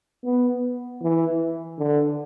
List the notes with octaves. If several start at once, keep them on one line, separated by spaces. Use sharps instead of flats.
B3
E3
D3